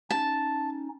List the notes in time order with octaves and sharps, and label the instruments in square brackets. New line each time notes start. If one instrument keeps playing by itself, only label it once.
[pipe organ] C#4 D#4 [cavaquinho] A5